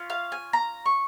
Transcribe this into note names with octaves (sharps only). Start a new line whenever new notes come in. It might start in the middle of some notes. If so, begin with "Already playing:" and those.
Already playing: C#4 F4
F5
G#5
A#5
C#6